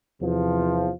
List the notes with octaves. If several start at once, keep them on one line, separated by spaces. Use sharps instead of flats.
E2 C3 F3